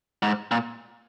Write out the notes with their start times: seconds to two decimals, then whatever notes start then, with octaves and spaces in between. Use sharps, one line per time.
0.23 G#2
0.51 A#2